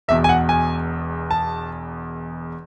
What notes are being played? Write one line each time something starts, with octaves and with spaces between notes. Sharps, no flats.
E1 E2 B2 E5
G#5
F#5
G#5
A5